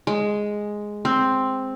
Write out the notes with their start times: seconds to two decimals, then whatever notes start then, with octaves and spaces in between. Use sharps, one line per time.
0.07 G#3
1.05 C4